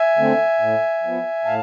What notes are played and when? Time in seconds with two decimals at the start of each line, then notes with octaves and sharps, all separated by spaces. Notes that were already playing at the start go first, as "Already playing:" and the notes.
Already playing: E5 G#5
0.17 D3 A3 C4
0.60 A2
1.03 F3 B3
1.45 A2 F5 A5